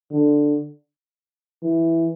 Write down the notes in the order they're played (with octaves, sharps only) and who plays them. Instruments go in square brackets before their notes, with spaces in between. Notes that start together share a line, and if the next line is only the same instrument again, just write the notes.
[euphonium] D3
E3